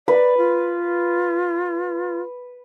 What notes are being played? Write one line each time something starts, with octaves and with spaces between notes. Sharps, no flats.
B4 D5
F4